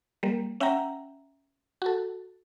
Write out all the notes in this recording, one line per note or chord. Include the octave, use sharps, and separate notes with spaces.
G3 A#3
C#4 E5 F#5 G5 A#5
F#4 A4